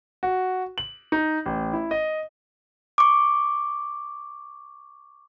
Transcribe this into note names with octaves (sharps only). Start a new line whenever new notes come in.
F#4
F#7
D#4
A1
E4
D#5
C#6 D6